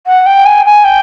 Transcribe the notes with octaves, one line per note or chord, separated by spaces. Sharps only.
F#5
G5
G#5
G#5
G5